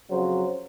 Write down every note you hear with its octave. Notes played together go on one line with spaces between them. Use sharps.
F2 C#3 F#3 C5